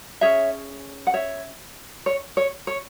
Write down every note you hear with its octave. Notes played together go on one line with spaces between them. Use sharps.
C#4 G#4 C#5 E5
F#5
C#5 E5
C#5
C#5
C#5